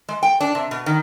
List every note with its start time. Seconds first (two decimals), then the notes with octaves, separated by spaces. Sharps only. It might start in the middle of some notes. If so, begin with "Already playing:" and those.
0.09 G#3
0.23 G5
0.41 D4
0.55 C3
0.71 B2
0.86 D#3